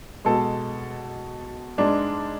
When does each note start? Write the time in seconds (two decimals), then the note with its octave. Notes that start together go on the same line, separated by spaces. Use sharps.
0.25 B2 G#3 A4
1.78 G#2 G#3 D4